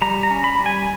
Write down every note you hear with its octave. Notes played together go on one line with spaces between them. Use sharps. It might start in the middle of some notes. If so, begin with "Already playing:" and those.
G3 A#5
A#5
C#4
B5
G3
G#5